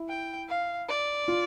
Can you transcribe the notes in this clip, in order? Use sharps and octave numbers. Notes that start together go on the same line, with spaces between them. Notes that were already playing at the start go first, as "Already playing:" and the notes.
Already playing: E4
G5
F5
D5
F4